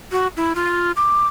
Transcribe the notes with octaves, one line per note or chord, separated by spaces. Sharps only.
F#4
E4
F4
D6